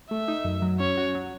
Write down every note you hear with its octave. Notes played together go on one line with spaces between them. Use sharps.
A3 E5
D#4
F#2
F#3
C#4 C#5
F#4
F#3